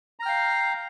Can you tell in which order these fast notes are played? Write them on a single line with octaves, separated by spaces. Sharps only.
A#5 F6 G5 F5